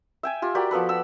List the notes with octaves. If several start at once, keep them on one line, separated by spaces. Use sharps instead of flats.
E5 G5 G#5
F4 G4
F#4 G4 A#4 D5
F3 B3 A4 B4
F#5 E6